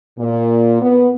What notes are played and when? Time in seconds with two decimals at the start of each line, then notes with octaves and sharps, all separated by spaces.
0.19 A#2
0.82 B3